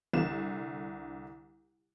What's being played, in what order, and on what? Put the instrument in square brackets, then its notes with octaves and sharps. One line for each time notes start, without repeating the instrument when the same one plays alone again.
[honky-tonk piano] C2 D3 E7